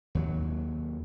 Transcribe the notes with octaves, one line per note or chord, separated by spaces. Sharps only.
D#2 F#3